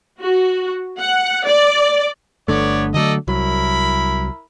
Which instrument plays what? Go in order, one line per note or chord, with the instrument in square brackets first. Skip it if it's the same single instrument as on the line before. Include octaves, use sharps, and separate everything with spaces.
[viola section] F#4
F#5
D5
[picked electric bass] G1 D3 A3 [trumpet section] B3 C#5 D5
[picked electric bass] D3 F#3 A3 [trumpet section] A4 D5 D#5
[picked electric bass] C2 F#3 [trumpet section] E4 A#4 B5